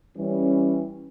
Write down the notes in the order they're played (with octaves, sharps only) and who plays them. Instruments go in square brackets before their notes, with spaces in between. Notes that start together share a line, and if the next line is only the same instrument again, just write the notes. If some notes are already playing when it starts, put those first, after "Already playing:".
[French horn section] E3 G3 C#4